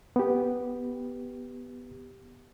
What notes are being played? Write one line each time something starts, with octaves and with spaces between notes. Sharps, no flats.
B3 G4